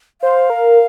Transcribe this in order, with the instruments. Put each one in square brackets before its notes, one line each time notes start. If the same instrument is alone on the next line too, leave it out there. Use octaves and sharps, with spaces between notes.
[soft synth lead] C5 [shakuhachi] F5
[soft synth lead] A#4